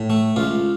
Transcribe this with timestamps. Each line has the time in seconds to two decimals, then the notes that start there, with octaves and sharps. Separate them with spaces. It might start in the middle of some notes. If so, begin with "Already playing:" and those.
Already playing: A2
0.10 A3
0.36 C#2 F4